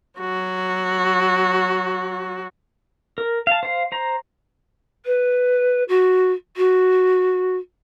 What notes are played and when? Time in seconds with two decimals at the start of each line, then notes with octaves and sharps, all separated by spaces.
0.20 F#3 F#4
3.18 A#4
3.47 F5 A5
3.63 C5 F5
3.92 C5 A#5
5.06 B4
5.89 F#4
6.57 F#4